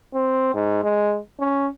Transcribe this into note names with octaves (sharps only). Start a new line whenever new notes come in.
C4
G#2
G#3
C#4